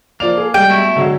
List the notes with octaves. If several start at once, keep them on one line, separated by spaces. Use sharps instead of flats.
F3 A#3 D5 F7
G#4 A4
G3 G#3 G5
B2 A3 E4
D3 F#3 G#3